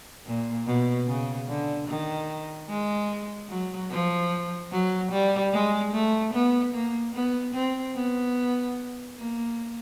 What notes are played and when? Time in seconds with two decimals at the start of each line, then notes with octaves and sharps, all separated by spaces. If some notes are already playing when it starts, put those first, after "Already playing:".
0.26 A#2
0.66 B2
1.07 C#3
1.48 D3
1.88 D#3
2.69 G#3
3.49 F#3
3.91 F3
4.72 F#3
5.12 G3
5.53 G#3
5.93 A3
6.34 B3
6.74 A#3
7.14 B3
7.54 C4
7.96 B3
9.17 A#3